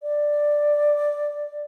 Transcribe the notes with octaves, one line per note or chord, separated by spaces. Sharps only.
D5